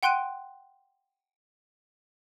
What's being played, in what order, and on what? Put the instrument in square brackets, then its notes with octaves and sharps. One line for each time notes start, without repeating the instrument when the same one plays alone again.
[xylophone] F#5 G5 C6 F#6 D7 D#7